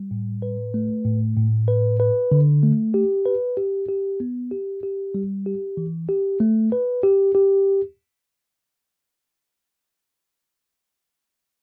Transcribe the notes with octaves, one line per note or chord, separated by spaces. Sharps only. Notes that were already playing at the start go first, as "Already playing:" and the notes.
Already playing: G3
A2
B4
A3
A2
A2
B4
B4
D3
A3
G4
B4
G4
G4
B3
G4
G4
G3
G4
E3
G4
A3
B4
G4
G4